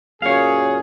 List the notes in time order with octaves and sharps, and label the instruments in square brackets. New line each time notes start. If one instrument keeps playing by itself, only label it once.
[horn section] F#2 A#2 G#4 [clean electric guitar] C#5 F5